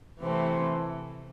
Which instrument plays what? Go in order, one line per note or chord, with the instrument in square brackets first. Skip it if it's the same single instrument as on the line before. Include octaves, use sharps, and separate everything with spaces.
[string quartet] C3 E3 A3 C4